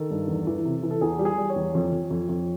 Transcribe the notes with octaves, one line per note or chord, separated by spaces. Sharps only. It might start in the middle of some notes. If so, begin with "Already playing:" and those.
Already playing: D#3 A4
G2
E2
E3
C3
E3
A4
E2 G#4
G3 G4
G#4
G3
C#5
E2
F2
F2
F2
F2